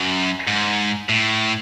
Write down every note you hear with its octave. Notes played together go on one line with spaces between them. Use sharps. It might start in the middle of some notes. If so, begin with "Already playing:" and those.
Already playing: F#2
G#2
A2